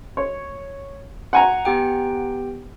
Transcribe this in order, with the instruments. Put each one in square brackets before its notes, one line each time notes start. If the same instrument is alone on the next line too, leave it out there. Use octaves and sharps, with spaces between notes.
[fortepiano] C#5
F#5 G#5 A#5
[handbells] B3 G4 G5